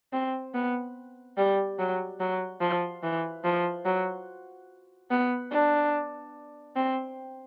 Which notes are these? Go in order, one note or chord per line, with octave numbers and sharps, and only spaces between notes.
C4
B3
G3
F#3
F#3
F3
E3
F3
F#3
B3
D4
C4